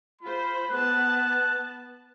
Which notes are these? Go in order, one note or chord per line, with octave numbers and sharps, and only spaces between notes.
F4 C5 B5
B3 B4 A5 F#6